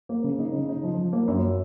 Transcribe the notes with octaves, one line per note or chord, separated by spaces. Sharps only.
A#3
C#3
D#4
C#3
D#4
F3
F3
A#3
F#2